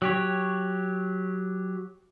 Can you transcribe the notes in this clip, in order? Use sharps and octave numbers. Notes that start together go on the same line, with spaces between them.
F#3 G4 C#5